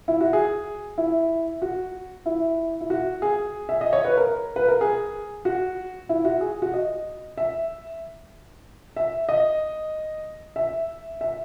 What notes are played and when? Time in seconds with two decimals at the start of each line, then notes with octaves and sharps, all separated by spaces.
0.08 E4
0.21 F#4
0.33 G#4
0.98 E4
1.62 F#4
2.26 E4
2.81 E4
2.90 F#4
3.22 G#4
3.69 E5
3.81 D#5
3.93 C#5
4.05 B4
4.17 A#4
4.56 B4
4.68 A#4
4.81 G#4
5.45 F#4
6.09 E4
6.25 F#4
6.41 G#4
6.62 F#4
6.74 D#5
7.37 E5
8.96 E5
9.29 D#5
10.56 E5
11.21 E5